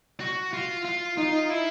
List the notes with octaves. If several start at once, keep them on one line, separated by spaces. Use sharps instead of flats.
F#4
F4
F4
D#4 F4
E4